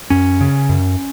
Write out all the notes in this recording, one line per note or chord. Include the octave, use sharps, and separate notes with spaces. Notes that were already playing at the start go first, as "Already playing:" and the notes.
F#2 C#4
C#3
F#2